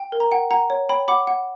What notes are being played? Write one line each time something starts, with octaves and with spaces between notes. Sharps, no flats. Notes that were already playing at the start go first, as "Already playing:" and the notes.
Already playing: G5
A#4
A#5
F#5 G5
F#5 A#5
C#5
C#5 G5 B5
F#5 B5 D6
F#5